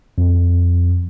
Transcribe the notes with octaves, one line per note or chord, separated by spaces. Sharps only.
F2